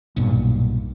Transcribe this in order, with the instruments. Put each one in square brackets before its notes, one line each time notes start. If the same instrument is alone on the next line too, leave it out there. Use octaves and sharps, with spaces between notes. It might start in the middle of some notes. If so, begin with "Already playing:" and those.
[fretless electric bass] B1 G2 A#2